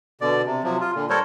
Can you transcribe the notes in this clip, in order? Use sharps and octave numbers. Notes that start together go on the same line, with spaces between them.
B2 D3 D5
C3
C3 F3 F#3
F4
A#2 D3
G3 A4 A#4 C5 C#5